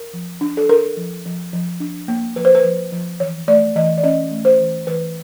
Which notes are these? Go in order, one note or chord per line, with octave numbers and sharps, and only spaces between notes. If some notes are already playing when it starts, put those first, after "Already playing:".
Already playing: A#4
F3
D4
A4
D4 A#4
F3
F3
F3
D4
A#3
F3 B4
C5
B4
F3
F3
E3 C#5
A3 D5
E3 D#5
D5
C#4 D#5
A3
C5
E3
E3 B4